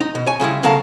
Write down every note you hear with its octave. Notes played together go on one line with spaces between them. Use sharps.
D#4
B2
C#5 G#5
C#3 G3 G#3 E4
C#3 F#3 A3 A#4 F5 A5